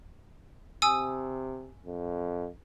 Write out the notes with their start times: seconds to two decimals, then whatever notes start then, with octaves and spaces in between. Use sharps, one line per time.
0.82 C3 G#5 D#6 E6
1.86 F2